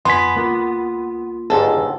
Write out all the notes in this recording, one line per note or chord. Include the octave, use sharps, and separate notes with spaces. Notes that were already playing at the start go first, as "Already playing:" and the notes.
F2 B3 G#5 C6 B6
C#2 A#3 F4
G1 C#2 G#2 G#4 A4